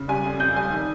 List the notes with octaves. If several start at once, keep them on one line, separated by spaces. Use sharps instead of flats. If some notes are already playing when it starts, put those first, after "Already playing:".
Already playing: C#3
G3 G#5
F2
F2 G6
G3 G#5
D#3